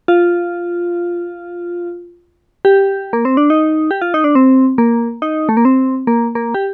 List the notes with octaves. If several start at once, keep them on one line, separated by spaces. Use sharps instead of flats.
F4
G4
A#3
C4
D4
D#4
G4
F4
D#4
D4
C4
A#3
D#4
A3
A#3
C4
A#3
A#3
G4